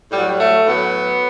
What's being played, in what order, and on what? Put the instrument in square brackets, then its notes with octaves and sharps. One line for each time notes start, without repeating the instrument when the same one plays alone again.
[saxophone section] A2 F#3 G3
G3
A3
A2 F#3 B3